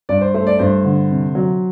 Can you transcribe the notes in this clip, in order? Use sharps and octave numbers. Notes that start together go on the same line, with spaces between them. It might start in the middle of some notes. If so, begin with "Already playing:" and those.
G2 D5
C5
A3 C5
D5
G2 C5
D3
C3
F#3